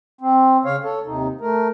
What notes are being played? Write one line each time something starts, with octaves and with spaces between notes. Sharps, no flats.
C4
C#3 C#5 F5
A4 C#5
D#2 C3 D#4
A3 A#4